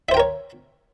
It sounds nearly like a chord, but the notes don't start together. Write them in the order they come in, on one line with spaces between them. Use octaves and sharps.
E5 C5 G5 A#4 C#5